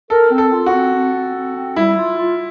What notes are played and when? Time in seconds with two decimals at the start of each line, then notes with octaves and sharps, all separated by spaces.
0.10 A4 A#4
0.31 C4
0.38 A4
0.52 F4
0.66 F#4
0.73 C4
0.94 C4
1.14 C4
1.35 C4
1.56 C4
1.76 G3 E4
1.97 F4
2.18 F4